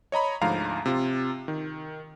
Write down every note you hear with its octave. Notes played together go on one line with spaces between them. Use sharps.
C#5 D#5 A#5 B5
D2 G#2 F3 F5 A#5
C3 F4
D#3